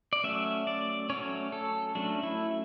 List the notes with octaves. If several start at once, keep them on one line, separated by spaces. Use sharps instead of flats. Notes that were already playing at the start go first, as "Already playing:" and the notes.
D5
F#3 A3 C#4 E5
D5
F#3 A3 C#4 C#5
A4
F#3 A3 C#4 D4
E4